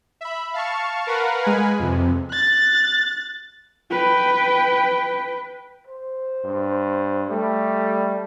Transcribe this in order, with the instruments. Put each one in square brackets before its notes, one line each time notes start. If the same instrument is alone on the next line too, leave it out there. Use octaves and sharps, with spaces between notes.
[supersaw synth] E5 B5
F5 A5 C#6
A#4 B4 F5 F#5
G#3 B4 G#5
F2 C3
[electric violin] F#6 A6
[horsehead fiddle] B4 G5
[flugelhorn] C5
[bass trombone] G2
[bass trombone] G3 [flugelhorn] A3